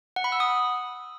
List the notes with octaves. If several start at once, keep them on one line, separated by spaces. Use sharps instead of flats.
F#5
B5
E6
D#6